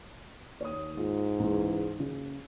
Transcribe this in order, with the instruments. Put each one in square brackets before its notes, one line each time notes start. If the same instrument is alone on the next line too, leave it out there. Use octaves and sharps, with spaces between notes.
[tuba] D#2 [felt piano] C#5 D#6
[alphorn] G#2 [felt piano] F4
[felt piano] C#2 [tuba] E3
[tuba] F#1 [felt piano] C#3